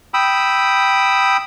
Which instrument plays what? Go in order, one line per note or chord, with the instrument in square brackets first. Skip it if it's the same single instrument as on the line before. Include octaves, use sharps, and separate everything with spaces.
[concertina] G5 B5 D#6 E6